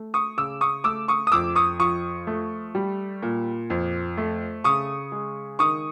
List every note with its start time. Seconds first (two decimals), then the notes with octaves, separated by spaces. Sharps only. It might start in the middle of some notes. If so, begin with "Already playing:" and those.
Already playing: A3
0.14 C#6 D#6
0.37 C#3 D6 E6
0.61 C#6 D#6
0.84 A3 D6 E6
1.08 C#6 D#6
1.27 D#6
1.32 F2 D6 E6
1.55 C#6 D#6
1.79 F3 C#6 D#6
2.27 A3
2.75 G3
3.22 A#2
3.70 F2
4.17 A3
4.64 C#3 C#6 D#6
5.12 G#3
5.59 D#3 C#6 D#6